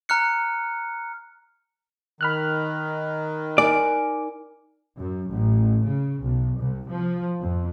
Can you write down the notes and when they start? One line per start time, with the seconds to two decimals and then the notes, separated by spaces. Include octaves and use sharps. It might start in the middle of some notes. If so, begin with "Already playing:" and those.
0.09 A#5 F6 F#6 C#7
2.21 D#3 B5 F6 F#6
3.58 D#4 A#4 D5 G#5
4.99 F#2
5.30 A1
5.85 C#3
6.23 B1
6.59 C2
6.91 F3
7.40 F2